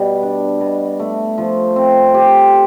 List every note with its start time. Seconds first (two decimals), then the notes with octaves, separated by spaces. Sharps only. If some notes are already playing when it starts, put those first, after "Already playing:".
Already playing: B2 G3
0.22 D4
0.61 B2
1.00 A3
1.38 F3
1.76 C4
2.14 G4